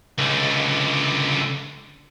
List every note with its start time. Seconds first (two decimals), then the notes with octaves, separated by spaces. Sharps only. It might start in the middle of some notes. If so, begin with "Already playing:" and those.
0.18 C#2 D3